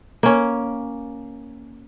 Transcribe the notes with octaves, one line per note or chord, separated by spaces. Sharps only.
A#3 C#4